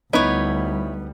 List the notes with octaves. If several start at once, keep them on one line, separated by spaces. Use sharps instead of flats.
D2 G3 B3 D#4 E4 C#5